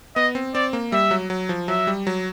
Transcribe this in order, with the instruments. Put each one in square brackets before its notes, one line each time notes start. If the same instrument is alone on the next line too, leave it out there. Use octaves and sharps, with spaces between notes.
[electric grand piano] B3 [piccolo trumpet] D#5
[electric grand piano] C4
[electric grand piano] C4 [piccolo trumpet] D5
[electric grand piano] A#3
[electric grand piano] G3 [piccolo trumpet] E5
[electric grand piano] F#3
F#3
F3
[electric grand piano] F#3 [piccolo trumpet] E5
[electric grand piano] G3
F#3